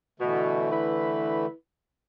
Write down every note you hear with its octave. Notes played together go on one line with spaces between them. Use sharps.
B2 D3 E3 A3
E4 B4